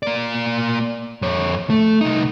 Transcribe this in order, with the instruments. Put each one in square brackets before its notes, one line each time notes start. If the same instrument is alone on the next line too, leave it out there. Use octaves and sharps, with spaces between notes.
[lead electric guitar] A#3 D5
F2 C#5
A3
C2 D#4